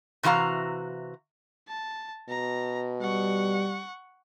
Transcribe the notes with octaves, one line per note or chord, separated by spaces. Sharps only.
C3 E3 F#4 F5 A#5
A5
B2 A#5
G3 F#5 C#6